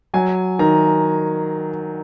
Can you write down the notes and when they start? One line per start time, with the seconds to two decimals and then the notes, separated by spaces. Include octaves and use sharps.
0.14 F#3 G#5
0.59 D#3 A#5